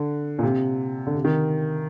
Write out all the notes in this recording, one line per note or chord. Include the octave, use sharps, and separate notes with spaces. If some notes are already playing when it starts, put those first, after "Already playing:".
Already playing: D3
A#2
C3
D3
C3
D#3